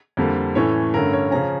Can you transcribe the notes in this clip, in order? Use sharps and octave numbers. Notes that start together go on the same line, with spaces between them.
F2 D3 G3 A#3
A2 E3 A3 C#4 C#5
G2 D3 A3 C#4 A#4
C#5
C#3 F3 C#4 A#5